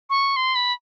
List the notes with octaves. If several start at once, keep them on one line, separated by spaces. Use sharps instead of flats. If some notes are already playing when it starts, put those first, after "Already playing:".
C#6
C6
B5